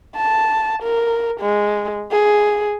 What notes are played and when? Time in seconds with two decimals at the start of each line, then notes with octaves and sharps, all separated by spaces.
0.16 A5
0.83 A#4
1.41 G#3
2.11 G#4